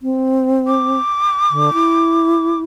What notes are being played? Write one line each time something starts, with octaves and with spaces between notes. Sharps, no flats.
C4
D6
D3
E4